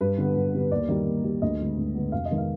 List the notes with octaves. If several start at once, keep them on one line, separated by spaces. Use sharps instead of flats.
G2 B4
D3 G3 B3
G2
D3 G3 B3
D#2 D5
D#3 G3
D#2
D#3 G3
D2 D#5
D3 G#3 B3
D2
D3 G#3 B3
F1 F5
D#5
D#3 G#3 B3
F5